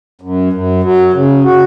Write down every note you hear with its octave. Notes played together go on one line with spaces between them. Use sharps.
F#2
F#2
F#3
C#3
F#4